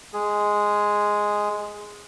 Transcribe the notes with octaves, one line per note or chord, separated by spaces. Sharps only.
G#3 G#4